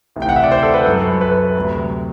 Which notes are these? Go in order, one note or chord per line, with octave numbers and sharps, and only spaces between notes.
D2 C3 E3
G5
F#5
E5
D5
C5
A4
B4
F#2 F#3 A4
B4
D2 C3 F#3